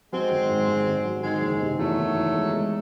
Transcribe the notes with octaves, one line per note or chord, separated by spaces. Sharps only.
F#3 G#3 C4
G#1
G#2
G#1
G#1
F#3
D#3 G#3 C4
F#1
C3
E2 F#3 A3
D#3
E2
G#3
G#3